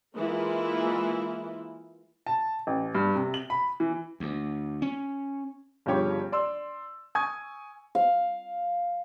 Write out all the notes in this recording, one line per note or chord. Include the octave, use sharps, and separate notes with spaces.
E3 G#3 A#3 E4 F4
A5
A1
G2
C3
F#7
B5
E3
D2
C#4
G1 C#3 F3 G4 C#5
D5 C6 E6
G#5 C#6 D#6 G#6
F5